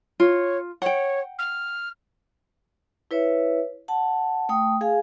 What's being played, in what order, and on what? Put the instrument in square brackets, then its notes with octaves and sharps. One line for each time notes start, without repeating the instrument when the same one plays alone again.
[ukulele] F4 [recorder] C#5
[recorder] C#5 [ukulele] F#5 G5
[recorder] F6
[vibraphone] E4 B4 C#5 E5
F#5 A5
A3 G5 D#6
G#4 F5 G#5